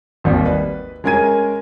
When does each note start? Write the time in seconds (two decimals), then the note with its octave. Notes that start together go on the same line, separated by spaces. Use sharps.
0.24 G#1 D#2 G3 D5
0.45 B4
1.04 G#3 C#4 A#4 G#5 G#6 D#7